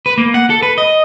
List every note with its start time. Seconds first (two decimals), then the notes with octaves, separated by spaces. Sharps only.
0.06 B4
0.18 A#3
0.34 F#5
0.50 A4
0.63 B4
0.78 D#5